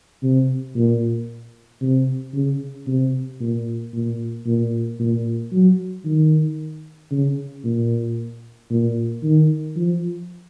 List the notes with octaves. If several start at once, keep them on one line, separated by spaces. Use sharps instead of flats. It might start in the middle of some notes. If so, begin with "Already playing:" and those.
C3
A#2
C3
C#3
C3
A#2
A#2
A#2
A#2
F#3
D#3
C#3
A#2
A#2
D#3
F3